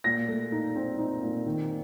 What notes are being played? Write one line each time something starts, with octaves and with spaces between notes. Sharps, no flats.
A#2 A#6
A3
D#4
C4
D#4
A#2
D#3